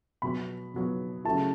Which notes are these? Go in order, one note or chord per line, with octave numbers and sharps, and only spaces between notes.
B2 F#3 B3 B5
B2 F#3 B3
C#3 F#3 A3 E4 A5